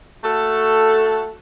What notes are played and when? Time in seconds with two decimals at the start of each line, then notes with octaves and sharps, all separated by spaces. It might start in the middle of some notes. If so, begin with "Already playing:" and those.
0.24 A3 F#4 A4